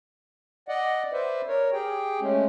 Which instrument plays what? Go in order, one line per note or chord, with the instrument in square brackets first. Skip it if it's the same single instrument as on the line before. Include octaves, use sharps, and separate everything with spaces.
[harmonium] D5 D#5 F#5
B4 C5 D5 E5
A#4 C#5
G4 G#4 G5
G#3 A3 C#4